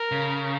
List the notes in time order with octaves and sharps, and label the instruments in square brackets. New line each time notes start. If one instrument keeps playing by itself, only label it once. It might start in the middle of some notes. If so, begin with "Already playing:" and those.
Already playing: [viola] A#4
[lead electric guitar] C#3